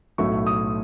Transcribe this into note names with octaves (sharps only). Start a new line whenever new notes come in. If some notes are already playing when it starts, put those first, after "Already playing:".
B1 A2 F#3 A3 C#6
D#6